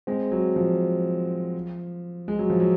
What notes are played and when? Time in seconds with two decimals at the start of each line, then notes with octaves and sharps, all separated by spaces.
0.07 G#3 C4
0.32 F#3
0.56 F3
2.28 G#3
2.39 F#3
2.50 F3
2.60 F#3